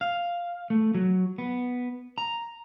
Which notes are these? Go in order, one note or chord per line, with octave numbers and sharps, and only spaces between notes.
F5
A3
F#3
B3
A#5